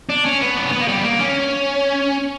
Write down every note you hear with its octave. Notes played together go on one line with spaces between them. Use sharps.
D4
C#4
B3
D4
C#4
B3
A#3
G3
B3
A#3
C#4